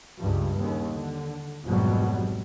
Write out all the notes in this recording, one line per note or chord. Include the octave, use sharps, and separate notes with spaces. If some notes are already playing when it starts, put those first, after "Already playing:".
C#2 G2
D#2 C#3
D3
G#1 F2 B2 F#3 G3